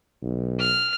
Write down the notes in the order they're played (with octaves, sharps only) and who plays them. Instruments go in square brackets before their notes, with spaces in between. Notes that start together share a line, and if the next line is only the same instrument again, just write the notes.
[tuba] B1
[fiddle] F6